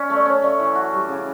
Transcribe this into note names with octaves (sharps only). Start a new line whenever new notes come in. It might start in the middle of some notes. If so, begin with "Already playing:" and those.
Already playing: C#4 D5
A3
D5
C#4 C#5
A3 D5
E3
F#4
G3
C#3